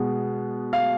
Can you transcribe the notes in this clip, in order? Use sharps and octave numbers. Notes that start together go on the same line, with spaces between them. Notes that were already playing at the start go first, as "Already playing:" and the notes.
Already playing: B2 G#3 B3
F5